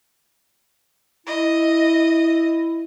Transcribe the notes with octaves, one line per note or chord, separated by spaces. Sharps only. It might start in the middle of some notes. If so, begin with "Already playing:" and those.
E4 D#5